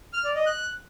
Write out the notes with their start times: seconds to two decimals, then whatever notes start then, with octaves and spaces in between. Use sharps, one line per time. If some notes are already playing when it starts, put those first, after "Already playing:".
0.13 F6
0.24 D5
0.35 D#5
0.46 F#6